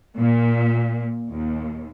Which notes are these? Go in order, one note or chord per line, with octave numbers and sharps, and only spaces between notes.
A#2
D#2